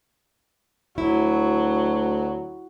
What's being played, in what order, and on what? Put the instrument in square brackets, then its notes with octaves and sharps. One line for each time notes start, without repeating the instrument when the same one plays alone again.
[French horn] D2 [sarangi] F#3 [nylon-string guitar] E4